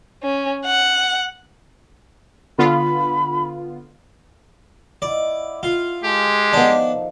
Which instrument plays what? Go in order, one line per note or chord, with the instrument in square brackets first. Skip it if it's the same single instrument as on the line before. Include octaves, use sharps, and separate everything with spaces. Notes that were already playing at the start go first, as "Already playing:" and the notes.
[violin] C#4
F#5
[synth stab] D3 B3 F4 [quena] B5
[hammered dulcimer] E4 D#5 F#5 [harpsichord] D5
[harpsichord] F4
[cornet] G#3 [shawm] G4 [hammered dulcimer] A4
[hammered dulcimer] D#3 F3 D#4 [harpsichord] B3 D4